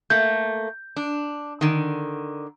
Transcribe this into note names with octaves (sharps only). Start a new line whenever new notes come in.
A3 A#3 G6
D4
D3 D#3